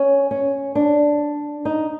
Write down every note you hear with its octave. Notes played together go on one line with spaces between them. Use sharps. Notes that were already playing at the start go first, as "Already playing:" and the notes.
Already playing: C#4
C#4
D4
D#4